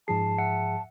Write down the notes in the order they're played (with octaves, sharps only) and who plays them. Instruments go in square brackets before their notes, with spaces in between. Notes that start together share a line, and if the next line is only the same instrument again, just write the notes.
[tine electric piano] G#2 F3 G#4 [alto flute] A5 [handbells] C7
[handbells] E5 F#5 C#7